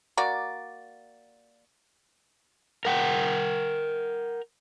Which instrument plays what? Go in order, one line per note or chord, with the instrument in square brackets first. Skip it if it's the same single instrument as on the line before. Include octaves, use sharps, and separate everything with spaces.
[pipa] A#3 F#4 D5
[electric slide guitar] A#4 F#5 G5